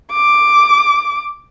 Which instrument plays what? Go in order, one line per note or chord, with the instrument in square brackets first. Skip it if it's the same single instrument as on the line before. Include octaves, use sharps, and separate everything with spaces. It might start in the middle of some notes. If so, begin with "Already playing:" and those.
[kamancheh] D6